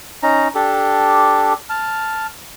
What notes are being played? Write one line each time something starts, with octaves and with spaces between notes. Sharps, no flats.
C#4 D#4 A#5
D4 G4 A4
A5 F6